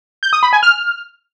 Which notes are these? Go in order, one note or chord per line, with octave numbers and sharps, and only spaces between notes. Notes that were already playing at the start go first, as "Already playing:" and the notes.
G6
D#6
B5
G#5
F6